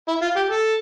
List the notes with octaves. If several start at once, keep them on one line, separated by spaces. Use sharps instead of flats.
E4
F4
G4
A4